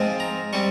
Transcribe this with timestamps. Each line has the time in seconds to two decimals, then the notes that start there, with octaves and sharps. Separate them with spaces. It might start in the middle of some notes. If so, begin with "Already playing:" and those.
Already playing: G#2 F3 C4
0.20 A#5
0.53 G3 C4 C#6